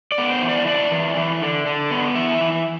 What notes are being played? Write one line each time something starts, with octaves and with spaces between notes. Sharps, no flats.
D5
B3
C5
E3
D5
D4 D5
E3
E3
D3
D3
B3
E3 E5
E3